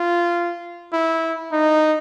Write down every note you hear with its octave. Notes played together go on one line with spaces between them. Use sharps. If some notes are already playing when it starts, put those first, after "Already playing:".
Already playing: F4
E4
D#4